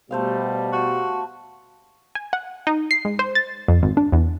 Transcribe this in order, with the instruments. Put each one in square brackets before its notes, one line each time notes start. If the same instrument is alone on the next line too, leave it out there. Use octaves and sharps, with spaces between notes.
[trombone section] B2 G3 [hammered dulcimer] A3 C5 F5
[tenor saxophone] F#4
[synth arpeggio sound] G#5
F#5
D#4
C7
G#2
C5
A6
F2
G#1
D4
E2